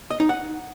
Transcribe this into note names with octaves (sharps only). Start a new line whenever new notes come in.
D#5
D#4
F#5